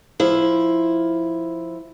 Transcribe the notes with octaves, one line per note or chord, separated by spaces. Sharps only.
F3 E4